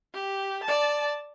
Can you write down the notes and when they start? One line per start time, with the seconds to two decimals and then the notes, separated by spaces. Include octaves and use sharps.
0.14 G4
0.64 D5 A5